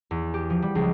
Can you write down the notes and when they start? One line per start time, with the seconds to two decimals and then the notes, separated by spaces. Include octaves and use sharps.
0.11 E2
0.34 G4
0.50 F3
0.62 G3
0.75 C#2